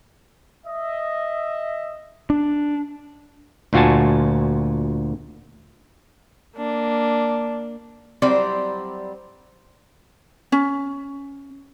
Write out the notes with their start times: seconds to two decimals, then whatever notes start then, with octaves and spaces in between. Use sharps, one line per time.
0.66 D#5 E5
2.30 D4
3.73 D2 A#2 F4 F#4 G#5 A5
6.56 A#3 D4
8.22 F#3 G3 C4 E4 C5 D5
10.52 C#4